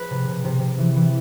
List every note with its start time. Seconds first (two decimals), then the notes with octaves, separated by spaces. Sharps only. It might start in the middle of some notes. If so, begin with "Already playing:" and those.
Already playing: F3 G#4 B4
0.10 C3
0.28 C3
0.44 C3
0.62 C3
0.78 E3
0.96 E3